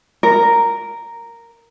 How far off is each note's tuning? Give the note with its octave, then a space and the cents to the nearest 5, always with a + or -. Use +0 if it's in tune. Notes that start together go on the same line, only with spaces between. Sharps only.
A#4 -5